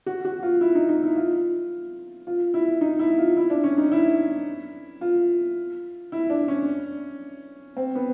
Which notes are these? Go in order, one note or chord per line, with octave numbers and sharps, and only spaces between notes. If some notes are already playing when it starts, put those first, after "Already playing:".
F#4
F#4
F4
E4
D#4
D#4
E4
F4
F4
E4
D#4
E4
F4
E4
D4
C#4
D#4
E4
F4
E4
D4
C#4
C4
B3